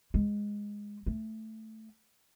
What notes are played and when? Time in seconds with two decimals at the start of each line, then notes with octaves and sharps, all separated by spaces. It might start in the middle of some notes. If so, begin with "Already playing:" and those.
0.14 G#3
1.06 A3